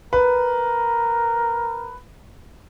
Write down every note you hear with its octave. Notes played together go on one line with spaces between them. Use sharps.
A#4 B4